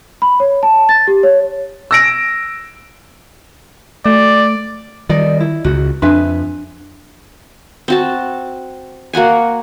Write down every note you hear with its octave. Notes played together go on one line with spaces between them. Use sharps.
B5
C#5
A5
A6
G4
C#5
E6 A#6 D7
A3 D5
D#3 G3 D5 D#5
E4
C#2 C#3 F#4
F2 D4 B4 E5 G#5
C4 F#4 A5
A#3 F#4 F#5 G#5